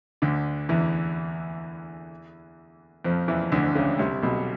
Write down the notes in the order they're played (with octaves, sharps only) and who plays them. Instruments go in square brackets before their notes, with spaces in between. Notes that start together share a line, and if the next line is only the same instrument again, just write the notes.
[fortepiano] D2 D3
E2 E3
F2 F3
E2 E3
D2 D3
C#2 C#3
C2 C3
B1 B2